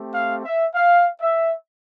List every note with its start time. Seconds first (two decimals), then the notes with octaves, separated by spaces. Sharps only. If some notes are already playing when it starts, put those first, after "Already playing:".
Already playing: A3 C4 G4
0.14 F5
0.45 E5
0.74 F5
1.21 E5